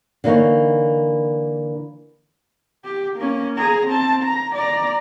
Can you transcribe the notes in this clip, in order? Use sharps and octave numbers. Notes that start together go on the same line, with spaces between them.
D3 E3 A#3 D#4 C#5
G4
A#3 C#4
G#4 A#5
C4 A5
A#5
D5 A#5